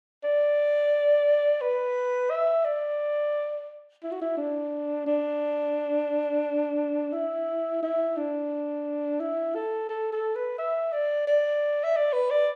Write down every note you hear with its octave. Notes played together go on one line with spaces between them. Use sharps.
D5
B4
E5
D5
E4
F#4
E4
D4
D4
E4
E4
D4
E4
A4
A4
A4
B4
E5
D5
D5
E5
D5
B4
D5